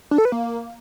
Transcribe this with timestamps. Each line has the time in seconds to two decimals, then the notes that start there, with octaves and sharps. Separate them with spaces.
0.11 D4
0.18 A4
0.25 B4
0.32 A#3